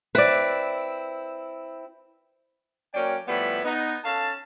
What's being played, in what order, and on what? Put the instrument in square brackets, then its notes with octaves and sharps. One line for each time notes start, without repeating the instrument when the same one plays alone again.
[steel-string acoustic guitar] C4 E4 [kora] B4 D5
[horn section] F#3 A#3 C#4 D5 G5
A2 F3 G3 B3 E5 B5
B3 D#4
C#4 A4 F5 A5